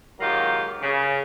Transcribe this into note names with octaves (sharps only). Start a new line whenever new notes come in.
G#2 D#3 F#3 A#3 F4 G4
C#3